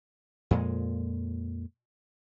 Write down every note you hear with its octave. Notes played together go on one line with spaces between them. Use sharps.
F2 A#2 G#3